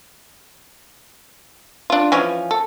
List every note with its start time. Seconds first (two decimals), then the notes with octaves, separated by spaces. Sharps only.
1.90 D4 F4
2.12 E3 F3 C#4
2.51 A4